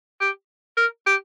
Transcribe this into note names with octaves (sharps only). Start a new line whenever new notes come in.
G4
A#4
G4